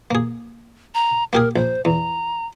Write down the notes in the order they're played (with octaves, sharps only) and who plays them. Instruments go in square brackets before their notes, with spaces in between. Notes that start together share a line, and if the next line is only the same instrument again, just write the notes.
[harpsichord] A#3 G#4
[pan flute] A#5
[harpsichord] A#3 G4 G#4 [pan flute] A#4
[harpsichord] A#1 [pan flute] C5
[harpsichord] E2 [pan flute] A#5